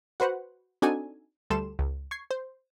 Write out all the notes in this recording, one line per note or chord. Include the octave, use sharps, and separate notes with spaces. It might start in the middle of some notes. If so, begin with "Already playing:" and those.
F#4 B4 C5 F#5
C4 D4 D#4 F#4 A4 G#5
D2 G3 A4 C6 E7
C#2
C#6 G#6 C7
C5